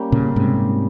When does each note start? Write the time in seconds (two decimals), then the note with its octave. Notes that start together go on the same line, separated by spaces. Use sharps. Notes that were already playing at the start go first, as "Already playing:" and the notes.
Already playing: G3 A#3 C#4 G4
0.12 A#2 C#3
0.36 G#2 C3